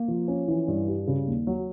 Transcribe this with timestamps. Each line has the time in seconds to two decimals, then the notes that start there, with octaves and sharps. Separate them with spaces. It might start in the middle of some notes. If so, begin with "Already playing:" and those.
Already playing: A#3
0.08 F3
0.28 C#4
0.48 E3
0.68 G2
0.88 G3
1.07 C#3
1.27 D#2
1.47 F#3